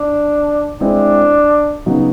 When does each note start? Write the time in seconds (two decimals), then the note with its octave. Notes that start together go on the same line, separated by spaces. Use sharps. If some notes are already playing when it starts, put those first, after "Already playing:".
Already playing: D4
0.80 G#3 C4 D4 E4
1.86 C#3 F#3 B3 D#4 F#4